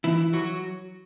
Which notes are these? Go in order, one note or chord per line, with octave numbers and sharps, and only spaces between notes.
E3 E4
F#3 F#4